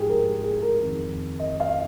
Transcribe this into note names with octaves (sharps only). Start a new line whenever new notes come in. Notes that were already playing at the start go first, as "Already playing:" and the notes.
Already playing: G#2 F3 G4 G#4
A#4
G#4
A#4
F2 D#3
D#5
F5